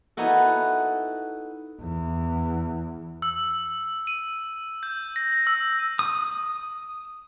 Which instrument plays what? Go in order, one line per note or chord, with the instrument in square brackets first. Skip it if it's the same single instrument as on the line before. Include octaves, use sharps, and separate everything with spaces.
[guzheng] B3 D#4 E4 F#4 A4
[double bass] E2
[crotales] E6
D#7
G6
A#6
E6
[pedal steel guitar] D#6